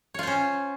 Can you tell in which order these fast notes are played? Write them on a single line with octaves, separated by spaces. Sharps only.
C#5 F4 C5 C#4